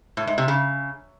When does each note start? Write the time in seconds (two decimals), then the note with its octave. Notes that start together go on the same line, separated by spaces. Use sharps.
0.17 A2
0.27 G#2
0.38 C3
0.48 C#3